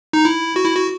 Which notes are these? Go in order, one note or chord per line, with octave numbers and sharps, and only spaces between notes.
D#4
E4
F#4
E4
F#4